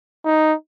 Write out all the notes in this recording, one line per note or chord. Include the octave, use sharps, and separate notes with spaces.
D#4